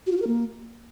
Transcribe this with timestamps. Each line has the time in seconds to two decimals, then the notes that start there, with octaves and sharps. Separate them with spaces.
0.07 F#4
0.12 F4
0.17 F#4
0.22 A#4
0.27 A#3